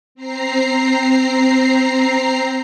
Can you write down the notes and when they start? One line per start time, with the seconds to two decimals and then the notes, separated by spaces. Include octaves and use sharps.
0.15 C4 A#5 C7